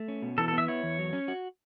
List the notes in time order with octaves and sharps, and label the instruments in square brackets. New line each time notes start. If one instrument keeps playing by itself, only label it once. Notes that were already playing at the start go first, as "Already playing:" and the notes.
Already playing: [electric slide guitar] A3
C#4
B2
[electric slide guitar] E3 [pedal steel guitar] A4
[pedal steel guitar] A4
[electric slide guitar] B3
[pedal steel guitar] E5
[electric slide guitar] E4 [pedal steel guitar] C#5
[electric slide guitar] E2
F#3
C#4
F#4